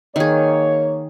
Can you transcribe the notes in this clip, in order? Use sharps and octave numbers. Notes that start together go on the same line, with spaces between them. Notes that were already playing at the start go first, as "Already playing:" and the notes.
D#3 A#3 G#4 C#5